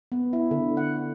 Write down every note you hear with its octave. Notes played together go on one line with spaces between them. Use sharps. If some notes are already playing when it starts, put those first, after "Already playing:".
B3
E4
D3
F#5